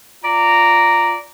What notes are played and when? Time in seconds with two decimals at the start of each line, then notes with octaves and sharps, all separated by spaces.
0.23 F4 D5 A#5